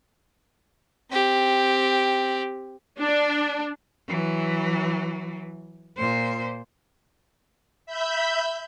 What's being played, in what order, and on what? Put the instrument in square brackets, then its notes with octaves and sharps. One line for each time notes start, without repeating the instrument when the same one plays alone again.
[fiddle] C4 G4
[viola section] D4
[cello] E3 F#3
A#2 C5
[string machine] E5 B5 G6